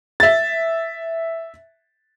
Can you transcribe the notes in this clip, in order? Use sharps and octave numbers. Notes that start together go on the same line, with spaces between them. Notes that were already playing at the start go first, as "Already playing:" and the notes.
E5 A6